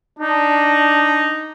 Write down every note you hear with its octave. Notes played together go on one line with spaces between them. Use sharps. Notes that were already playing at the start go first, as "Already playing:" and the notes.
D4 D#4